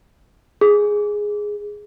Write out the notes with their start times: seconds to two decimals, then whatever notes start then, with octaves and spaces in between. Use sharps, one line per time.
0.61 G#4